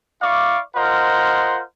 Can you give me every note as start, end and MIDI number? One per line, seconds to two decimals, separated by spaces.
0.22 0.59 64
0.22 0.59 74
0.22 0.59 77
0.22 0.59 85
0.22 0.59 86
0.76 1.61 65
0.76 1.61 70
0.76 1.61 72
0.76 1.61 75
0.76 1.61 78